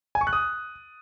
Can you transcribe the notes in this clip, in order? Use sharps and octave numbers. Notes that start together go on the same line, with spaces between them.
G#5
C#6
F#6
D#6